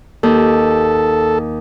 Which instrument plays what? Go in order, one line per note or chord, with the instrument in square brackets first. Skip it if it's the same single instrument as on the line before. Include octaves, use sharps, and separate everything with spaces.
[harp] D#2 [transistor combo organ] A4